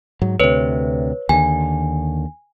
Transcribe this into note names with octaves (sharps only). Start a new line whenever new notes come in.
G#2 F#3
D2 C3 B4 C#5
D#2 D3 G#5